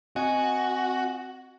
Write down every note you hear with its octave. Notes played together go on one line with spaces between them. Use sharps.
C4 F#4 D#5 G#5